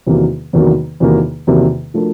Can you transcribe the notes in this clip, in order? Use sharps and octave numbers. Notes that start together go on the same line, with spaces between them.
E2 C3 D#3 F#3 A#3
E2 C3 D#3 F#3 A#3
E2 C3 D#3 F#3 A#3
E2 C3 D#3 F#3 A#3
F3 A3 D4 F#4 A#4